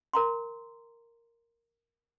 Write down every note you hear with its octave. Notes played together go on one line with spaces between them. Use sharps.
A#4 A#5 C6